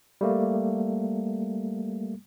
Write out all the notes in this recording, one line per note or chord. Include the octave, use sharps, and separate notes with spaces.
G3 A3 A#3